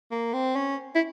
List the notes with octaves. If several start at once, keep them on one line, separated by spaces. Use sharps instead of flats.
A#3
C4
C#4
E4